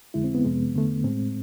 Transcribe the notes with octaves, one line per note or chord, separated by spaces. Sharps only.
F2 D3 G#3 E4
C4
B3
F2 C3 G#3
E2 D3 A3
A2 G#3 C4